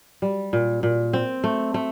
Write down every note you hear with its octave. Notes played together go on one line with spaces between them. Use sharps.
G3
A#2
A#2
C4
A3
A3